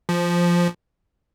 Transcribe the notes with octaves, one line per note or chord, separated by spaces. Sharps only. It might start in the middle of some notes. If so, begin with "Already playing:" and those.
F3